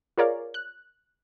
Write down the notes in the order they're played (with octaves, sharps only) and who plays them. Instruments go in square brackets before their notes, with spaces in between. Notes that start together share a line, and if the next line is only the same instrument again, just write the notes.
[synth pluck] F4 G#4 A#4 C#5 D5 F5
F#6